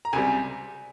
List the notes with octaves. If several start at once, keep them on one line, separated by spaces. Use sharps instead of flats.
A#5
C#2 C3 G3 G#5